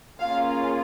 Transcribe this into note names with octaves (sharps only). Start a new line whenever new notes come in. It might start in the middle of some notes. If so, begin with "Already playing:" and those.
A#3 C#4 F4 G#4 F5